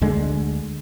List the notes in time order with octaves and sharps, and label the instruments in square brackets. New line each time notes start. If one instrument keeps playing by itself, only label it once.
[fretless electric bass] D2 D3 G#3